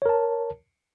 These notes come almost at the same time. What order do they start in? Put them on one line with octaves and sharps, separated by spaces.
C#5 A#4 A5